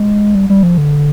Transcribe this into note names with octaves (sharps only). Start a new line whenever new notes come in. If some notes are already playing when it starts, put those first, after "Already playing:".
Already playing: G#3
G3
G3
F3
D3